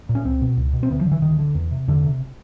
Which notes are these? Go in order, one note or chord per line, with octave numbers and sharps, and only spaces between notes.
A#2
C#4
C#2 C4
B2
C#2
B2
C4
D2 B3
F3
D3
E3
D2 D#3
D3
E2
C3
E2 D3
C3